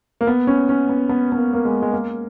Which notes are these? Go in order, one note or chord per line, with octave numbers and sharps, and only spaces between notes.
A#3
B3
C#4
C#4
B3
B3
B3
A#3
A#3
G#3
G#3
A#3